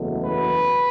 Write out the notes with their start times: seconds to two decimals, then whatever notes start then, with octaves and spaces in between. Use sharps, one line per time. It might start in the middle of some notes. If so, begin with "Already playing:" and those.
Already playing: F#1 E2 B2 F#3 A3
0.23 B4